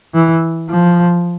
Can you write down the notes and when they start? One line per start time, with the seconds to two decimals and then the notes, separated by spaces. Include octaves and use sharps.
0.14 E3
0.70 F3